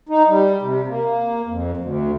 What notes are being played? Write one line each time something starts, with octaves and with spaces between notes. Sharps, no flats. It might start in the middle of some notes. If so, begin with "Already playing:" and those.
D#4
G3
C3
A#3
F2
D2